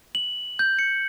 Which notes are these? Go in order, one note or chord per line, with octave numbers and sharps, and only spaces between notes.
F#7
G6
C#7